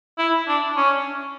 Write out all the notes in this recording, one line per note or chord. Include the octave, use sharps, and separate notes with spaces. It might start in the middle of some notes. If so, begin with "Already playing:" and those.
E4
D4
C#4